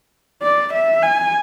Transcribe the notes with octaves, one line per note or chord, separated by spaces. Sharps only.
D5
E5
G#5